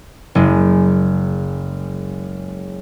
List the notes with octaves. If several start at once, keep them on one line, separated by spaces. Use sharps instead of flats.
F#1 G#3